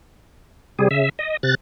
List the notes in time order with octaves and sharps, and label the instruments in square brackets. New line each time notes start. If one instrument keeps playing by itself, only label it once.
[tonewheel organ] C3 G3 G#4
C#3 E5
D#5
C3 F#6 A6